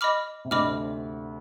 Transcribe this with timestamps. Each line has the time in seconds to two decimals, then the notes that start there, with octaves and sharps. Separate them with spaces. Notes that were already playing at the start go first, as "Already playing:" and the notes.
0.01 D#5 B5 D6 F6
0.45 C3
0.51 D2 D3 D#5 B5 D6 F6